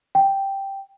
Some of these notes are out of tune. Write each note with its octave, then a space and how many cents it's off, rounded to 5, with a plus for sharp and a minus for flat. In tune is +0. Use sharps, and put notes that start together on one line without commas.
G5 +0